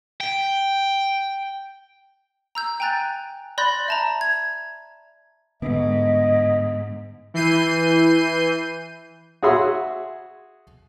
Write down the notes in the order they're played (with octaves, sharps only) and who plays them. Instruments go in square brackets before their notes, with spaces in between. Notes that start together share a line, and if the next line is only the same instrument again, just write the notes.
[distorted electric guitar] G5
[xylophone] A#5 E6 G6
G5 G#5 A#5 F#6 A6
D5 B5 C6 F#6 G6 A#6
E5 A5 A#5
G#6
[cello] G#2 [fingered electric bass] D3 B3 [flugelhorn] D#5
[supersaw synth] E3 G6 C7 D#7
[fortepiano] F#4 G#4 C#5 E5 C6